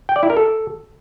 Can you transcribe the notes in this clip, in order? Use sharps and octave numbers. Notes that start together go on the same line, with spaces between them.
G5
D5
E4
A#4
A4